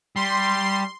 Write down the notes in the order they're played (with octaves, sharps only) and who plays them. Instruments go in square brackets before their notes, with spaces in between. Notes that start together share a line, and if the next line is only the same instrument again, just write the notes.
[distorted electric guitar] G3 [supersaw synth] C6